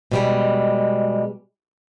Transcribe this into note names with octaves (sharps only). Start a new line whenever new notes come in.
B2 G3 G#3